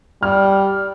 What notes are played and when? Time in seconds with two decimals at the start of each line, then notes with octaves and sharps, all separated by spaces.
0.23 G3 F6